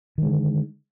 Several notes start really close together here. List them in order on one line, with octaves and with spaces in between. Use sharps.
D#3 G#3 D3